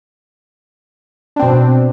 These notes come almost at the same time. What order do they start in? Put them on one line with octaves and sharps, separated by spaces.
D4 C4 B2